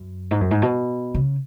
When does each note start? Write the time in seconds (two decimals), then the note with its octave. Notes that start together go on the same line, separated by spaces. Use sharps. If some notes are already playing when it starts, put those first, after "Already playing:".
Already playing: F#2
0.31 G#2
0.41 F#2
0.51 G#2
0.62 B2
1.14 C#3